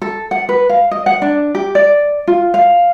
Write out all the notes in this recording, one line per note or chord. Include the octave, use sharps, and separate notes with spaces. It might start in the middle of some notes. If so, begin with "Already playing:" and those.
A4
F#5
B4
F5
D#5
F#5
D4
G4
D5
F4
F5